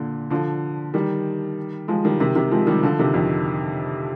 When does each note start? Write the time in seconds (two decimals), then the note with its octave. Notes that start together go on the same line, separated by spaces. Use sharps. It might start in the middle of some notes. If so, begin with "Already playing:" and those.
Already playing: A#2 D3
0.30 D3 F3
0.94 D#3 G3
1.88 F3 G#3
2.04 D#3 G3
2.20 C3 D#3
2.35 C3 D#3
2.51 F3 G#3
2.67 D#3 G3
2.83 D3 F3
2.99 C3 D#3
3.14 F2